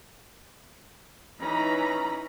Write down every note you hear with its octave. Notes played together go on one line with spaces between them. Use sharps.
E3 C#4 D#4 A#5 B5